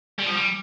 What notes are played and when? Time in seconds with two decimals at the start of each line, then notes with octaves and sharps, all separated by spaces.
0.19 G3
0.26 F3
0.35 G3